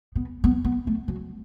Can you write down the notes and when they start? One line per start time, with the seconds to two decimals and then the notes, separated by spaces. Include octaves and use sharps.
0.16 B3
0.44 B3
0.65 B3
0.87 A3
1.08 F#3